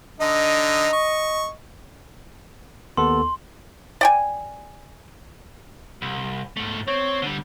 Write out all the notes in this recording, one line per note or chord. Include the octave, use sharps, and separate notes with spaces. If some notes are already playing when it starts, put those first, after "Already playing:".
D3 D#4 D#5
C#6
D#2 B3 A4 C6
D5 G5 G#5
C2
G#2 A3
C4 C#5
D3 G3